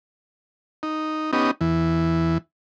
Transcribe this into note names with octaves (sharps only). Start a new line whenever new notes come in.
D#4
B3 C#4 D#4 G4 D#5
E2 E3